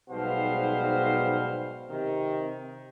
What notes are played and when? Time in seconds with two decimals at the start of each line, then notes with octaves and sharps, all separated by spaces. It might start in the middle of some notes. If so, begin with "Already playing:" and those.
0.10 B1 G#2 B2 G3 C5 F5
1.90 C3 D#3